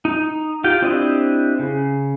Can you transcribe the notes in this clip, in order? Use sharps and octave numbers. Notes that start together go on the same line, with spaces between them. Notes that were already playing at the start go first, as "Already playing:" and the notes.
D#4
F4 G4 G5
C4 D4 E4 G4 D#5
C#3